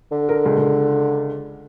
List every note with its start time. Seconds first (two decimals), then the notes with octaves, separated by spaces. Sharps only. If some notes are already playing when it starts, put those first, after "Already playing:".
0.12 D3
0.29 A#4
0.45 C#2
0.58 C#2